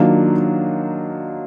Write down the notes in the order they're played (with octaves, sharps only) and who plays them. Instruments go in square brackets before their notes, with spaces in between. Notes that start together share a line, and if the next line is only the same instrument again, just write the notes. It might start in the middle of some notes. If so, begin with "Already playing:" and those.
Already playing: [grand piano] D#3 F#3 A#3 D4 F4